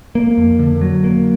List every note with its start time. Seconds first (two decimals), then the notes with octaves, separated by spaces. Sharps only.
0.15 A#3
0.38 F2
0.59 D3
0.81 F#3
1.04 A#3